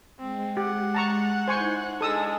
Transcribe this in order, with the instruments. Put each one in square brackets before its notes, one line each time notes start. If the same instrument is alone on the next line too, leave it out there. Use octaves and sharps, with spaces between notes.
[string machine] G#3 [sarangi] C4
[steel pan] G4 [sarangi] F#5
[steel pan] A5 A#5 C#6
[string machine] D#4 E4 [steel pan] C5 G#5 C#6
[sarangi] G#3 [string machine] D4 [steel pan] A4 D#6 E6